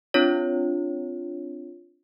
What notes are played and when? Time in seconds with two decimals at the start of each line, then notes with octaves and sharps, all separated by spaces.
0.14 C4 D4 F4 C#5